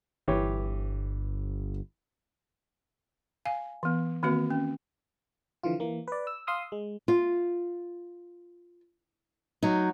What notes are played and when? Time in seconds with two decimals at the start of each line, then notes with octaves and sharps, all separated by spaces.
0.28 G1 E3 G4 C#5
3.45 F5 G#5
3.83 E3 B3
4.23 D#3 A#3 C4 F#4 B4
4.50 C#4
5.63 D3 E3 F3 F4
5.80 E3 A#3
6.08 B4 D5
6.27 E6
6.47 F5 C6 D#6 E6
6.72 G#3
7.08 F4
9.62 F#3 D#4